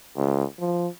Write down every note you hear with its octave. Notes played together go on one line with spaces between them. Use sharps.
C#2
F3